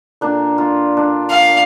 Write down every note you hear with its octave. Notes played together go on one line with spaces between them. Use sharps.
A#2 D4
F4
D4
F5